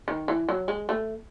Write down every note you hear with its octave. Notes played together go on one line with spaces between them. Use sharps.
D#3
E3
F#3
G#3
A3